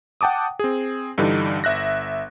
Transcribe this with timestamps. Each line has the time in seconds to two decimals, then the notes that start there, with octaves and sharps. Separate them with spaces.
0.21 F#5 G5 A5 D6 D#6
0.59 C4 G#4
1.18 G2 D3 E3 G3 D#4
1.64 G1 E5 F#6 A#6